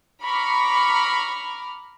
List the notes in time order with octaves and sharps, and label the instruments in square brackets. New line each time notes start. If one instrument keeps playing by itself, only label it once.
[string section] A#5 B5 C#6 D6 F6